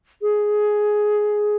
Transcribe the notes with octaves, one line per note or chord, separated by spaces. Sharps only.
G#4